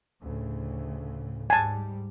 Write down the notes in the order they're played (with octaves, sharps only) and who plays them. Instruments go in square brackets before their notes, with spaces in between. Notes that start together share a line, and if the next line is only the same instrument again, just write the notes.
[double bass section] D2 A2 C#3
[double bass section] G#2 G3 [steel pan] G#5 A5